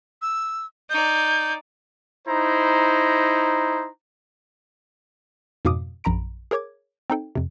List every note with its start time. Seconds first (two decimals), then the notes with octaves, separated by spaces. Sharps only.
0.22 E6
0.90 D#4 D5 G6
2.28 D#4 E4 C5 A#5
5.65 F2 G#2 B2 F5 D6 D#6
6.04 A#1 F#2 A#5 B5 D7
6.51 G#4 A#4 C#5 D6 G#6
7.10 C4 D#4 A4 G5
7.35 F2 C3